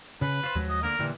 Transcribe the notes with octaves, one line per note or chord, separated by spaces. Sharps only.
C#3 B4
F4 C5
D#2 F3 F#3 G#3
D#5
D3 A#3 A#4
A#2 D3 E3 G3